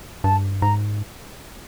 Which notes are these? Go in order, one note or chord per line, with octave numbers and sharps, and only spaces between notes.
G2 A5
G#2 A#5